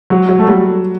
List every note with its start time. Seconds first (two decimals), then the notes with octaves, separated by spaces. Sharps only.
0.10 F#3 F#4
0.29 F#3
0.39 A3
0.47 F#3 G3